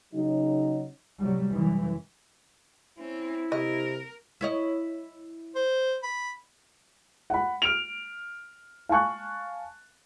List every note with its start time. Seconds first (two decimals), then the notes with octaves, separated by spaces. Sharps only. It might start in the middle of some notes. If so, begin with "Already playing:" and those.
0.13 C#3 F#3 D#4
1.19 A2 C3 F#3 G3
1.52 F#2 E3
2.99 C4 C#4 E4
3.52 C3 A#4 D#5
4.41 E4 C#5 D#5
5.55 C5
6.03 B5
7.30 F#5 B5
7.62 F6 D7 F7
8.89 F5 G#5 A5 C#6 F#6